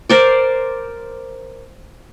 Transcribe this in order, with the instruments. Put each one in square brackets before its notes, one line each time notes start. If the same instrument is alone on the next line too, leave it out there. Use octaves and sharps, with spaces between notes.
[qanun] A#4 C5 D5